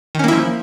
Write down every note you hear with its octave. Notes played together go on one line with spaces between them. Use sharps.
D#3 F3 A#3 C#4 E4